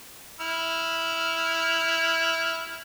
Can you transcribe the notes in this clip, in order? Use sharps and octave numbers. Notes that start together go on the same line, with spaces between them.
E4 F6